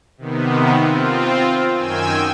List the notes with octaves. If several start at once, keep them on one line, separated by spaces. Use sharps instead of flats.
C3 D#3 B3
C4 F4
F#2 D#3 G5 G#5 E6